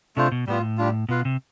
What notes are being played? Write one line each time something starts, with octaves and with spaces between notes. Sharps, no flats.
C3 A3 D4 F4 C5
B2
A2 G3 B3 F4
G3 D4 F4
B2 F4 B4 F5
C3